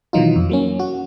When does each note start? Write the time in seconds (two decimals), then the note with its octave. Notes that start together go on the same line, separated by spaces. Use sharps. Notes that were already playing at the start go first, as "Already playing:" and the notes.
0.13 B2 D#3 E3 F#3 D#4 F4
0.36 F2
0.49 F#3 A#3 C#4
0.79 F#4